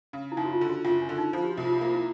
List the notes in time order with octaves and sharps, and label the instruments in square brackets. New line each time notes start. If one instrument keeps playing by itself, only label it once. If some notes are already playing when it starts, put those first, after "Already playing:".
[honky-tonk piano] C#3
[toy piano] E4
[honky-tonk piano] F#1 [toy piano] D#4
[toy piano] F#4
F4
[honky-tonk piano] D3
[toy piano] F#4
[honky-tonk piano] F#1 [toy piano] F4
[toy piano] D4
[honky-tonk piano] D3
[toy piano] D#4
[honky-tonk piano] F3 [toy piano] F4
[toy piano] G4
F#4
[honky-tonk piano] C2
[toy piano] F4
[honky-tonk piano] A#3 [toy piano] F4
[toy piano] E4